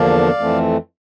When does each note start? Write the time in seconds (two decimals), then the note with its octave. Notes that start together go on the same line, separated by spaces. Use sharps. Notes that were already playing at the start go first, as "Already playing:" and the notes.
Already playing: E2 D3 F3 A#3 D4 D5 F5
0.39 F2 E3 A3 C4